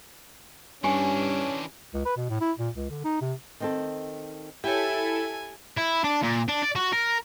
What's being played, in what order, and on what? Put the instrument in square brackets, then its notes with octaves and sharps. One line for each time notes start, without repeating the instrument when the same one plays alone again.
[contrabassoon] G2 [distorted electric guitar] E3 D4 [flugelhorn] C#4 [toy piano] G4 G#5
[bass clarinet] C#2
B4
B2
A2
E4
A#2
C#2
D3
D#4
C3
[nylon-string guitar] D#3 C4 A4
[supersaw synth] E4 A4 [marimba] G4 C#5 [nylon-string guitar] G5 [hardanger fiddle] G#5
[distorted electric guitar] E4
D4
A#2
D4
D5
F#4
A#4